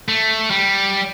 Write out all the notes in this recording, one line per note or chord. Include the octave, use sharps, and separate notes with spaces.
A3
G3